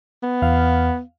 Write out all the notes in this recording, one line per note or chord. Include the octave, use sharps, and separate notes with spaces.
B3
E2 F5